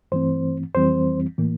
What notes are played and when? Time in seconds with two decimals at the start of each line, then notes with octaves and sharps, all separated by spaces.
0.12 G2 E3 A3 C4 C5
0.75 F2 E3 G3 C4 C5
1.38 A2 E3 A#3